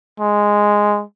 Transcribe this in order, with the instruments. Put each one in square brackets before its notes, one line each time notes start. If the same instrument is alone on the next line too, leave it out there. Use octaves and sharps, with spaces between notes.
[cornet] G#3